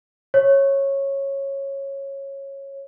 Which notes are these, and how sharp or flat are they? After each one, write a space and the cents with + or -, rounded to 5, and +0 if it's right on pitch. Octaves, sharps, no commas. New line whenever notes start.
C#5 -15